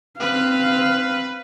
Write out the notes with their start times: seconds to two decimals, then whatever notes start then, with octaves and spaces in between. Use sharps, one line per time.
0.20 C4 B4 F5